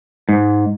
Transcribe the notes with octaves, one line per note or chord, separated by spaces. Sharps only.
G#2